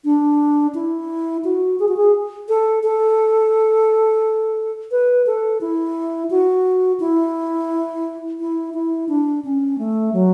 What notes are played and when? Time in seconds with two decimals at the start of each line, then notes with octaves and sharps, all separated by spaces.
0.05 D4
0.75 E4
1.44 F#4
1.80 G#4
1.88 F#4
1.97 G#4
2.49 A4
2.83 A4
4.91 B4
5.26 A4
5.61 E4
6.30 F#4
7.00 E4
8.40 E4
8.74 E4
9.09 D4
9.45 C#4
9.79 A3
10.13 F#3